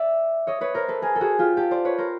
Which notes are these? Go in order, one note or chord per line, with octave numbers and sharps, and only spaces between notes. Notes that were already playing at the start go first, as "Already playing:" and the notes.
Already playing: D5 E5
C#5 D#5
B4 C#5
A#4 C5
A4 B4
G#4 A#4
A4
F#4 G#4
F4 G4
G4 A4
C5 D5
B4 C#5
A#4 C5